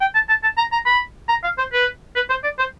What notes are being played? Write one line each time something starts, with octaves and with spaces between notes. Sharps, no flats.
G5
A5
A5
A5
A#5
A#5
B5
A#5
F5
C5
B4
B4
C5
D5
C5